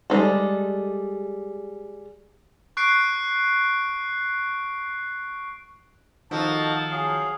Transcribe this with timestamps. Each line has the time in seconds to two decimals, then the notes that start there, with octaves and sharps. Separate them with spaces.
0.10 G3 G#3 C4 A4
2.77 C#6 F#6 C7 D7
6.31 D#3 F3 D#4 F#4 A4 A5
6.91 F#3 G#4 F5